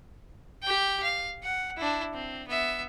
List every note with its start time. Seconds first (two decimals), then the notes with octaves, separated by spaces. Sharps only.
0.63 G4 G5
1.03 F5
1.43 F#5
1.77 D4 E4
2.14 C4
2.47 B3 E5